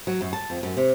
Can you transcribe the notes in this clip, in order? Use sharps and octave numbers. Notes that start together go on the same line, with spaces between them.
F#3
F#2
A5
F2
F#2
C3